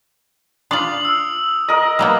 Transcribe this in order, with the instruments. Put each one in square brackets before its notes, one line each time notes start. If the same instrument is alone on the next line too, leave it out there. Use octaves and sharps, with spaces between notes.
[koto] D4 F4 [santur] C6 [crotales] D#6 F#7
[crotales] E6 F6
[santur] A#4 D#5
[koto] G3 A#3 B3 [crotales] D6